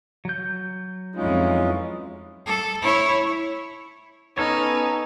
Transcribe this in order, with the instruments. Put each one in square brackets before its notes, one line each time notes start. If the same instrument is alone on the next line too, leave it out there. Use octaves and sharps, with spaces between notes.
[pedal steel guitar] F#3 G6
[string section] F2 E3 G#3 [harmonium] C#4 D#4 F4
[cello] A4
E4 C#5
[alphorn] B3 [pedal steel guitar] C#4 A4 C#5 [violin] D#4